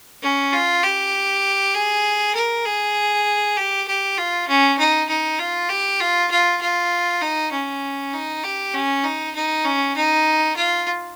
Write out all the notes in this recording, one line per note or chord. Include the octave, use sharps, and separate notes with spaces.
C#4
F4
G4
G#4
A#4
G#4
G4
G4
F4
C#4
D#4
D#4
F4
G4
F4
F4
F4
D#4
C#4
D#4
G4
C#4
D#4
D#4
C#4
D#4
F4